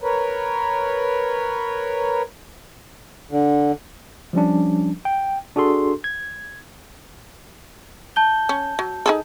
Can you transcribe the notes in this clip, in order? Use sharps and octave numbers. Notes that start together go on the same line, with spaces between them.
A#4 B4 C#5
D3
F3 G3 C#4 D4
G5
D4 F#4 G#4 A4 C6
G#6
A5 G6 G7
C#4
F#3
D#4 G#4 A4